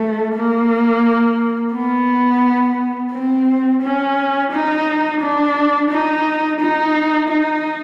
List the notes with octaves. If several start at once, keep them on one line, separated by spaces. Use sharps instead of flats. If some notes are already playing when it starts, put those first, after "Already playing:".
Already playing: A3
A#3
B3
C4
C#4
D#4
D4
D#4
D#4
D#4